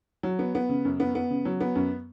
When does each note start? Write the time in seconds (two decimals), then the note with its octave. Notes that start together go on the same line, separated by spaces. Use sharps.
0.23 F#3
0.39 B3
0.55 B3
0.69 C#3
0.85 F#2
1.00 B3
1.15 B3
1.30 C#3
1.45 F#3
1.60 B3
1.75 F#2